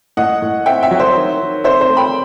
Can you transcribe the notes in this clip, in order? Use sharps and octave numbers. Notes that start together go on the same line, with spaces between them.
A2 D#5 F#5
A2
C4 E5 G5
E5 G5
F#3
C5 E5
D#3
D#3
C4 C5 E5
C5
A3
G5 B5